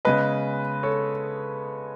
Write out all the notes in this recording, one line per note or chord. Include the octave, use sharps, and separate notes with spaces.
C#3 G#3 B3 B4 D#5
A4 C#5